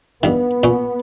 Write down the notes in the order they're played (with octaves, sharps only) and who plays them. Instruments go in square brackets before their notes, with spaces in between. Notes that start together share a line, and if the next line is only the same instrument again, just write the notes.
[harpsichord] G2 D#3 [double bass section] B3
[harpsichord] A#2 C#4